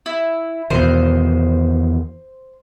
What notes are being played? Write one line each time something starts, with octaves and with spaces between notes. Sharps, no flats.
E4
E2 B2 D#3 C5